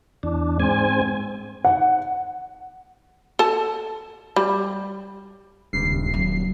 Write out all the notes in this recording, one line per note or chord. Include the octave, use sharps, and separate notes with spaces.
E2 D4
G#2 C4 G#5
F#5
A4 A5
G3
D#1 C#2 G2 C7
F#3